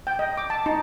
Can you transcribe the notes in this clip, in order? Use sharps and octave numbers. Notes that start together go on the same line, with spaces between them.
G5
D#5
D6
A5
D#4